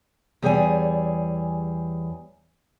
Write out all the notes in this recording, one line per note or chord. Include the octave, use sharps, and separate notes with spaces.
E2 G3 G#4 C#5 D#5 G#5